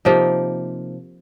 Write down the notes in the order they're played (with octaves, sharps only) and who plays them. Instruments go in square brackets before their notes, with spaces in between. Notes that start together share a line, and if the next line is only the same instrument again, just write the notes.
[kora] C3 F3 A#3 D#4